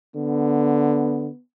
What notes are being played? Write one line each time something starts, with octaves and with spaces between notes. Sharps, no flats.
D3 B3